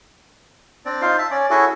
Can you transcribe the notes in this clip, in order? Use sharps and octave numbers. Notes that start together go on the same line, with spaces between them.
C4 D4 D5
D#4 F4 C5
E5 A5
C#4 D5
C#4 E4 F#4 G#4 A4